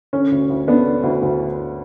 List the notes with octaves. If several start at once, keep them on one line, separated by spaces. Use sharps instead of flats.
D3 C#4
D2
D2
D3 B3 D4
D3
D2
D2